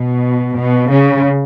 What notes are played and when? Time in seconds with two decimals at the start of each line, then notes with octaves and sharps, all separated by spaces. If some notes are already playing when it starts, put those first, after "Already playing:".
Already playing: B2
0.56 B2
0.89 C#3